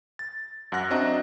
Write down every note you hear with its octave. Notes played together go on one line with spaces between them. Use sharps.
A6
F#2 F#5 F#6 A#6
C4 D4 F#4 D#5 E5 A#5